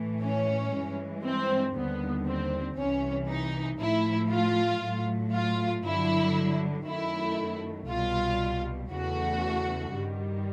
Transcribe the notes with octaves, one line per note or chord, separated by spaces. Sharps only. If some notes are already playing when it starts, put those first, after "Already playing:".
Already playing: A2 E3 A3
C#4
G2 E3 G#3
C4
D#2 D3 G3 B3
C4
C2 C3 E3 C#4
D#4
A2 F3 A3 E4
F4
A2 F#3 A3
F4
G2 D3 F#3 E4
F#2 D#3 F#3 A3 E4
C2 B2 G3 F4
E2 C#3 E3 A3 F#4
G2 D#3 G3